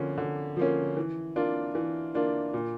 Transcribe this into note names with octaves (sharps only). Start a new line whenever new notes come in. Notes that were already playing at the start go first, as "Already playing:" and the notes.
Already playing: D3 F3 A#3 C#4
D3
F3 A#3 C#4
E3
A#3 D4 F4
E3
A#3 D4 F4
A#2